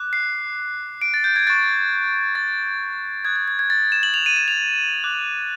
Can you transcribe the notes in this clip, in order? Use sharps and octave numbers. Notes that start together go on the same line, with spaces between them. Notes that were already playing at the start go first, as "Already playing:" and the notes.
Already playing: D6 F#6
C7
D7
A6
G6
G#6
C#6 F#6 A6
A6
D#6 F#6 G#6
G#6
G#6
G#6
A6
E7
F#7
F7
D#7
E7
F7
D6 F#6